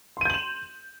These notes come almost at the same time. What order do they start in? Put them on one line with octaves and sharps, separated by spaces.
C6 D#7 G6 F#7 E7